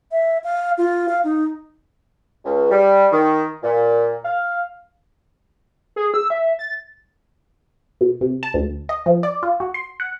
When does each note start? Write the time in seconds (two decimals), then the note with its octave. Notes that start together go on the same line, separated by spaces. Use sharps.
0.12 E5
0.44 F5
0.78 F4
1.09 F5
1.24 D#4
2.45 C#2
2.71 G3
3.12 D#3
3.63 A#2
4.25 F5
5.96 G#4
6.14 E6
6.30 E5
6.59 A6
8.01 B2
8.21 C3
8.43 A5
8.54 D2
8.89 D#5
9.06 F3
9.23 D5
9.43 F4
9.60 F#4
9.74 C6
10.00 F#5